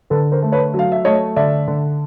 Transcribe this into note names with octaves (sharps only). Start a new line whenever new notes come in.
D3 A4 B4
A#4 C5
A3
B4 C#5
F#3
F5
E5
A3 C#5 D#5
D3 D5 E5
D3